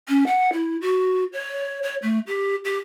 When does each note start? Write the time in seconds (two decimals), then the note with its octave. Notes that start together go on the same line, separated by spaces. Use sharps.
0.09 C#4
0.27 F#5
0.53 E4
0.82 F#4
1.33 C#5
1.83 C#5
2.03 A3
2.27 G4
2.65 G4